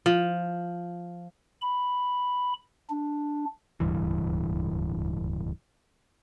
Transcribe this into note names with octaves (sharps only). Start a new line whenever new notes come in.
F3
B5
D4
D1 C#2 G2 E3